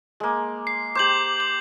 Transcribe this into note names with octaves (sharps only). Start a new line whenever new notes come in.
G#3 A#3
C7
G4 C5 D6 G6 F#7
F#7